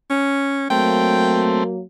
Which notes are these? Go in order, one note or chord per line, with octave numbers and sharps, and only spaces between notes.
C#4
F#3 A3 A#3 C4 G5